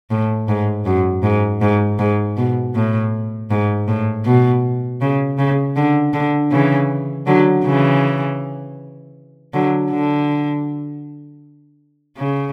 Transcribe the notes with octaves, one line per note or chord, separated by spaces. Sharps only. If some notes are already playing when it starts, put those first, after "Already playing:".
A2
G#2
F#2
G#2
G#2
G#2
B2
A2
G#2
A2
B2
C#3
C#3
D3
D3
C#3 E3
D3 F#3
C#3 E3
D3 F#3
D3
C#3